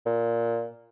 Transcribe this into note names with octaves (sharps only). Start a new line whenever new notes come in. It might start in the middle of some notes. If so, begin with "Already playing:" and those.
A#2